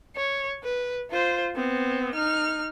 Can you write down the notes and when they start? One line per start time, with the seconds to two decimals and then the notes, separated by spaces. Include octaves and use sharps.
0.16 C#5
0.64 B4
1.11 F4 C5
1.55 B3 C4
2.15 D#4 F6